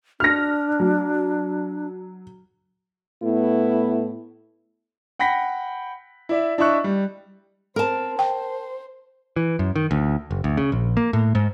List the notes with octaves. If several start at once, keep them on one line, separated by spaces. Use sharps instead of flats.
D4 F6 A#6
F#3
A2 A3 B3 E4
F#5 G5 B5 A#6 B6
E4 D5 E5
D4 E4 D#5 E5 C#6 F#6
G3
C4 A#4 A5
C5 G5
E3
F#2
D#3
D2
F#1
D2
C#3
A#1
A#3
A2
G#2